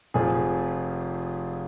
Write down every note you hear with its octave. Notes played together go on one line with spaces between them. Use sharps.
F1 F2 F3 F4 G#4